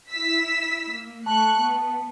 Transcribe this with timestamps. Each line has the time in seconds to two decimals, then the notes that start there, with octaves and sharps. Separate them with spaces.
0.11 E4 E6 B6
0.92 A#3
1.26 A3 A5 C#6 F#6
1.60 B3